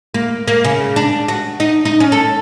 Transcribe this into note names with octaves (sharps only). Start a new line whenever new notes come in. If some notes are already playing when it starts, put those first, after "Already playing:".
A#3
A#3
C#3
D4
F#4
D#4
D#4
C#4
A4